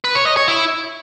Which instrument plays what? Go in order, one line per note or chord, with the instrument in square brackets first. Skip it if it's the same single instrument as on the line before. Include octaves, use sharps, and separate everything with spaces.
[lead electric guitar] B4
C#5
D#5
C#5
E4